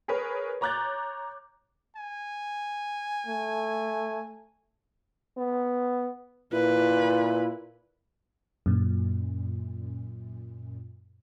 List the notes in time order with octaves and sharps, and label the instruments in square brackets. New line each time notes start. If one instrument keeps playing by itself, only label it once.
[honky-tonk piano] G#4 A#4 B4 C#5
C#5 A#5 D6 F#6 G6 A6
[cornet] G#5
[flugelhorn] A3
[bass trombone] B3
[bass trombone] A#2 [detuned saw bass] E4 [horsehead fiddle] B4
[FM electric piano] F#2 A#2